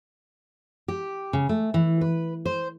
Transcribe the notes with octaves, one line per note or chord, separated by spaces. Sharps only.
G4
C#3
A3
E3
B4
C5